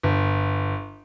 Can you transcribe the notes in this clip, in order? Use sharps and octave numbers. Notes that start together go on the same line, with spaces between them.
G1